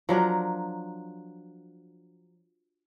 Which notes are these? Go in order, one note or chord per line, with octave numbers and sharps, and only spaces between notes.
F3 F#3 D4 A#4